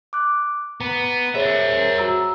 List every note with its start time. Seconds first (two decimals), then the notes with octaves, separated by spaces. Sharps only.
0.13 D6 F#6
0.81 B3 A#5
1.35 G#4 A#4 C5 C#5 E5
1.98 F#4 A#5 E6